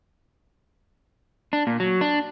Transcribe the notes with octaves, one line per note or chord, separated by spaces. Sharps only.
D4
A#2
F#3
D4